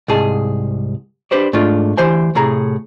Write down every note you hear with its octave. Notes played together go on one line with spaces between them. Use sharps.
C2 G#2 G#4 A5
D4 G4 B4 C5 D5
G#2 A3 D4 F4
D2 E3 G4 C5 G#5
A2 C3 G#4 A#5